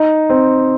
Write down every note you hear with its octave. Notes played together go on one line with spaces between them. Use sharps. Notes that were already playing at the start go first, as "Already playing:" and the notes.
Already playing: D#4
C4